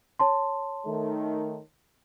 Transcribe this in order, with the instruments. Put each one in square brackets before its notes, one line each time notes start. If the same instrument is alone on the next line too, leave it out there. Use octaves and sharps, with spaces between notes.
[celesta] C#5 A5 C6
[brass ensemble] D#3 A3